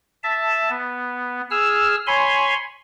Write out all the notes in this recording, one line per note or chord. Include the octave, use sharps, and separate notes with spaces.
E5 A5
B3
G#4 E6 F6
C#5 G#5 B5 C6